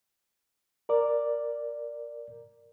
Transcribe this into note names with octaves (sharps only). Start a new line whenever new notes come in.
A#4 D5